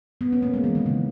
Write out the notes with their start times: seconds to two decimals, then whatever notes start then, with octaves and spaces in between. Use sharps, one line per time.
0.21 B3
0.32 C#4
0.42 A#3
0.54 G#3
0.64 E3
0.75 D#3
0.86 C#3